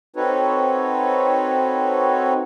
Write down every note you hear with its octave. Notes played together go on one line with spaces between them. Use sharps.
C4 D#4 F#4 A4 B4 C#5